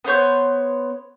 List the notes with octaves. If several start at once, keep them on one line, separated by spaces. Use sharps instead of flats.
B3 C5 C#5 G6